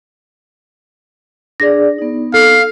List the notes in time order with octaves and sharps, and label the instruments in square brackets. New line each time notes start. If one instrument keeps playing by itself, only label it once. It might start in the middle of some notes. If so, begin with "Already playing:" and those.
[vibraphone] D4 G#4 D5 [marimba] A#6
[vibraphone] B3 D#4
[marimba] A4 [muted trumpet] F5